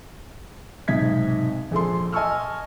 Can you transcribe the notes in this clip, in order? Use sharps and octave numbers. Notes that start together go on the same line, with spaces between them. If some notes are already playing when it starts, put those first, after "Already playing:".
B1 G#2 C3 D#5 G#6 B6
A#1 G#4 A4 C6
D#5 G#5 A5 C#6 E6 F6